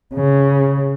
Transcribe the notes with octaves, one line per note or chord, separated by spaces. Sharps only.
C#3